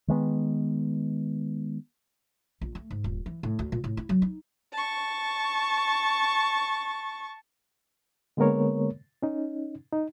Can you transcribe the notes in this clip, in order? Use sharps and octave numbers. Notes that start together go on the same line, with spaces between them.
D#3 G#3 B3
A#1
A3
G#2
D#1
E3
A2
D2
A#2
A2
E4
F#3
D#4
A5 C#6
D3 G#3 A#3 B3 A#4 C#5
C#4 D#4
D#4